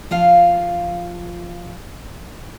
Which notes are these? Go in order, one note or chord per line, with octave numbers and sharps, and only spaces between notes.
F3 F4 F5